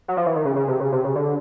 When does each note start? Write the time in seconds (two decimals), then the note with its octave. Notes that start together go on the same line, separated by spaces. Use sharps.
0.08 F#3
0.17 F3
0.26 E3
0.35 D#3
0.45 C#3
0.56 C#3
0.68 C3
0.80 C#3
0.92 C3
1.04 C#3
1.15 D3